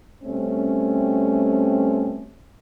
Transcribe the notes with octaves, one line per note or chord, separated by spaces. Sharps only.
B2 G3 A3 C4 C#4